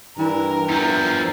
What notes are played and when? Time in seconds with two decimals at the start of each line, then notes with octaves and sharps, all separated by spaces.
0.18 G2 E3 A#4
0.68 E2 F3 E4